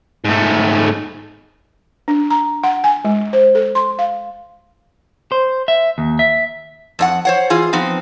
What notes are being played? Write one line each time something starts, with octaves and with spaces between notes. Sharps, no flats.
G#2 A3
D4
A#5
F#5
G#5
G#3
C5
A4
C6
F5
C5
E5
D#2
E5
F2 D4 F#5
C5 C#5 F#5
E3 F4 G#4
F3 B3 C4 D#4